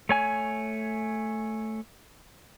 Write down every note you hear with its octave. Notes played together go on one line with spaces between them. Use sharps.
A3 C#5 G#5